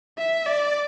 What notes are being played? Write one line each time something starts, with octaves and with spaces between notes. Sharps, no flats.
E5
D5